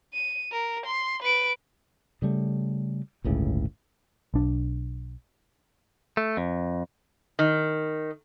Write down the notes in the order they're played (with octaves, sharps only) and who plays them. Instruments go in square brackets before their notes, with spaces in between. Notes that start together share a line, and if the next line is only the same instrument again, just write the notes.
[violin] D#7
A#4
C6
B4 D7
[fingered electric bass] C#3 G3 A3
G1 C#2 A2 C#3
[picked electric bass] B1 D4
[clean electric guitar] A3
F2
[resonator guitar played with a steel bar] D#3